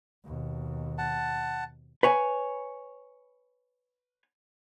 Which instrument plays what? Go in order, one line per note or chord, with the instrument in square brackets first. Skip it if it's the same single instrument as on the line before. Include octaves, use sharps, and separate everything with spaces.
[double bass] D#2 B2
[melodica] F#5 A5
[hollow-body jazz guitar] B4 C#5 G#5